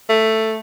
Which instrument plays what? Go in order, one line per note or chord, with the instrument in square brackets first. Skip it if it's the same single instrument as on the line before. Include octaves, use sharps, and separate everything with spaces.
[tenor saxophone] A3